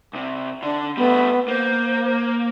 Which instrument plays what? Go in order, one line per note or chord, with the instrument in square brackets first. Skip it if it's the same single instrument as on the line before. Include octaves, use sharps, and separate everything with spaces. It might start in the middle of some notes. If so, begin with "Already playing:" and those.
[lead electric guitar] C2 C3
[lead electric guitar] D3 [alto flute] D4
[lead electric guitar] G3 A3 [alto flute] B3
[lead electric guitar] A#3 [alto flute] C5